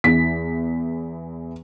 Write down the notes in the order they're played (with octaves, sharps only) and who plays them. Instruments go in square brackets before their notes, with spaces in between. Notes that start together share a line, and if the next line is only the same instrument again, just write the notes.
[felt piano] E2 E3 B6